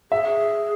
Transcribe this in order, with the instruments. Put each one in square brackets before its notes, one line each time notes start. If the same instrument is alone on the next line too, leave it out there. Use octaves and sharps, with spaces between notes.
[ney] G#4 [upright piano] E5